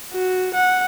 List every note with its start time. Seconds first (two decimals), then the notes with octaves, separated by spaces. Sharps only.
0.13 F#4
0.55 F#5